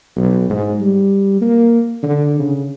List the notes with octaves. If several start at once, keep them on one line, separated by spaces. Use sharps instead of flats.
B1
G#2
G3
A#3
D3
C#3